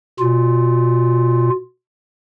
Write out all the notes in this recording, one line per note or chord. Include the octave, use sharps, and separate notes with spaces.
B2 F4